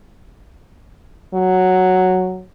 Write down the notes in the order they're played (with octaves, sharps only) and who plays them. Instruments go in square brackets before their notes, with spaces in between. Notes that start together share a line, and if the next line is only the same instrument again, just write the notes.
[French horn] F#3